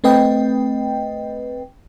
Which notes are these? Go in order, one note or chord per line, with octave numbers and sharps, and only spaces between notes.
A3 C4 B4 D#5 G5